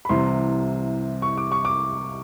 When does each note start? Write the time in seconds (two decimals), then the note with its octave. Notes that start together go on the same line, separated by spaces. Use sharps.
0.05 B5
0.09 C2 C3 E3 C6
1.22 C#6
1.38 D6
1.52 C#6
1.65 D6